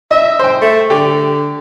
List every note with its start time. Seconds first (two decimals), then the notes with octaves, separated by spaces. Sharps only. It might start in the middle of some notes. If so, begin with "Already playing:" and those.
0.11 D#5 E5
0.39 C5 G5
0.62 A3
0.90 D3 G4